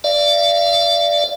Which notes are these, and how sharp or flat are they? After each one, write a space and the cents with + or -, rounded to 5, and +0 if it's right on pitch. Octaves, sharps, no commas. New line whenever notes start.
D5 +0 F5 -40